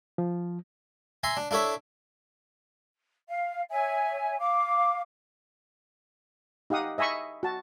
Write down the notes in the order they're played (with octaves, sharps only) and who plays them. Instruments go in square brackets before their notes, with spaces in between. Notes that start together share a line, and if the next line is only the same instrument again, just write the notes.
[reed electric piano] F3
[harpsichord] E5 G#5 A#5 C6
D4
D4 E4 A4 C#5 E5
[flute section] F5
C#5 E5 G#5
F5 D6
[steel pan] D#4 G4 F5 F#5 D#6
D#5 E5 G#5 B5 C#6
F#4 A5